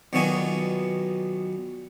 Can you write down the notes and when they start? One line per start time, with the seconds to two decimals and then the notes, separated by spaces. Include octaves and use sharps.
0.13 B1 A#2 D#3 F#3 B3 G#5